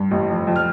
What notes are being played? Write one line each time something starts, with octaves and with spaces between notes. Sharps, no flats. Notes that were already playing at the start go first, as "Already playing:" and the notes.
Already playing: G2
A1
F2
F2
F6